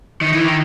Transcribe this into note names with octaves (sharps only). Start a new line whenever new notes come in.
D#3
E3
D#3